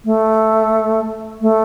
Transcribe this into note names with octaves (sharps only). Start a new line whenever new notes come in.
A3
A3